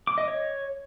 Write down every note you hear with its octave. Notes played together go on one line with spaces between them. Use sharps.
D6
D#5
C#5